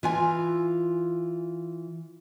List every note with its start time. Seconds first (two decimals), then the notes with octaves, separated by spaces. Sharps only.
0.03 E3 F4 G#5